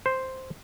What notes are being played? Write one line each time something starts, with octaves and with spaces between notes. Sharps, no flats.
C5